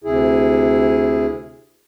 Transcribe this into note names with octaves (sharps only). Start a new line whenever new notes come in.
D2 C3 E4 G#4